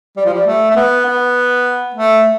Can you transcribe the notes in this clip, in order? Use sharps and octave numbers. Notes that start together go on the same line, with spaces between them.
G3
F3
G3
A3
A3
B3
B3
A3